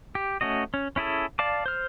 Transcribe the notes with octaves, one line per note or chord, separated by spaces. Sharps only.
G4
A3 C#4 F#4 D#5
C#4
C#4 E4 G#4 A4
D5 F5 A5 D6
C5 F6